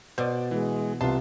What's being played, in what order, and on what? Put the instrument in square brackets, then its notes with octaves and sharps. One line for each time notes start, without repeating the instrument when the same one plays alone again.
[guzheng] B2 [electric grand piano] C5 D5
[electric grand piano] E3 [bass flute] G#3
[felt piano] C2 [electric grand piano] F4 A5 [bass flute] B4 [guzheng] C6